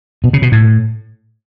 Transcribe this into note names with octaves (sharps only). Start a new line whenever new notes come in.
B2
C#3
B2
A2